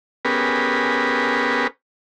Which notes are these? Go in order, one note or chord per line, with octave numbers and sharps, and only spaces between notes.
B3 C#4 G4 G#4 A#4 B4